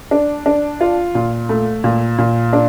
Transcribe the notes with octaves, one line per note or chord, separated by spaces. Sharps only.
D4
D4
F4
A#2
A3
A#2
A#2
D4